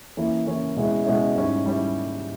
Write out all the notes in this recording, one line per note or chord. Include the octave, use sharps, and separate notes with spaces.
E3 A#3 C#4 E4
E3 A#3 C#4 E4
B2 G#3 C#4 E4
B2 G#3 C#4 E4
G#2 G3 C#4 E4
G3 C#4 E4